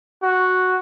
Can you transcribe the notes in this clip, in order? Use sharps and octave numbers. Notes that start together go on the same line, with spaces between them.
F#4